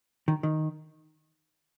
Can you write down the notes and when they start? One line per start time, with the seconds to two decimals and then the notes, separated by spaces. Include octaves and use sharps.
0.28 D#3
0.43 D#3